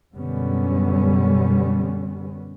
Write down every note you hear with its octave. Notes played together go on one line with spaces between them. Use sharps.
F#2 B2 D3 G3 B3 C#4